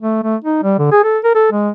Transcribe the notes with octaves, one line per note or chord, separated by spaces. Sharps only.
A3
A3
D#4
G3
D3
G#4
A4
A#4
A4
G#3